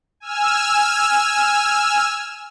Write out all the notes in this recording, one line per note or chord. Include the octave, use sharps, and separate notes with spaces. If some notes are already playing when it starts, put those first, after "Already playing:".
G#5 E6 F6